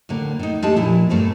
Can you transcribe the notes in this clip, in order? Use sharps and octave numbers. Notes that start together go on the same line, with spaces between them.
A2 D3 A#3
A2 D#4
G#3 A3 D4 G4 A5
A#2 F3 E4
G2 A3 A#3 C4